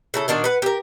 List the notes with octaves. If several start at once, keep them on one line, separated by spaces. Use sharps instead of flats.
C#3 E4 A4
A#2 D#3 D4 F#4
B4 F#5
G4 A#4